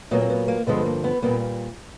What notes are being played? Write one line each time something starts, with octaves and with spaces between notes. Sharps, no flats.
A#2 F#3 A#3 B3
C4
B3
A#3
G2 D3 F3 G#3 B3
A#3
B3
A#2 G3 A#3 B3